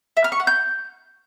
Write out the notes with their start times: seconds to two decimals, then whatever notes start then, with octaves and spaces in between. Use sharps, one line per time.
0.17 E5
0.24 F6
0.32 C#6
0.40 F#5
0.47 G6